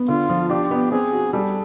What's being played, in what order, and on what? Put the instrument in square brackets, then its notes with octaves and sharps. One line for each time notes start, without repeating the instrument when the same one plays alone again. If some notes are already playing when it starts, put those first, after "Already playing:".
Already playing: [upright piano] B3
[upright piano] D3 [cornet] F4
[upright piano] F3
[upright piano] D4 [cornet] G4
[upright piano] B3
[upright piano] C4 [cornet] G#4
[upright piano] F#4
[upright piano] G3 [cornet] A4